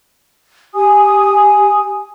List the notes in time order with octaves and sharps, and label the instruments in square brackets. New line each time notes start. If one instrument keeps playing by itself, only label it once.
[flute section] G4 G#5 D#6